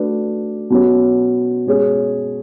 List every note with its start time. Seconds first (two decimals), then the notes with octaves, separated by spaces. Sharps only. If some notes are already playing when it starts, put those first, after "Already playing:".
Already playing: A3 D4 F#4 B4 D5
0.70 B2 F#3 C#4
1.67 B2 G#3 C#4 G#4 C#5